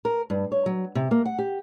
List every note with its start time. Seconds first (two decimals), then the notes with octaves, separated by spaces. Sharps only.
0.05 A#4
0.30 G2
0.52 C#5
0.66 F#3
0.95 C3
1.11 A#3
1.25 F#5
1.39 G4